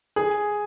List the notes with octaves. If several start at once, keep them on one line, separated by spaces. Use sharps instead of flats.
G#4